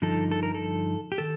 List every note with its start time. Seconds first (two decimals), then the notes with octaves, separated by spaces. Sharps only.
0.02 G2 D3 F3 D#4 A4
0.31 A4
0.43 A#4
0.54 A4
1.12 G4
1.18 D#3 A4